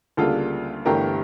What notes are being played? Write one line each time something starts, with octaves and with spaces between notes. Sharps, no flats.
D2 C#3 G3 A#3 F4 A4
G1 G2 E3 A3 G4 A#4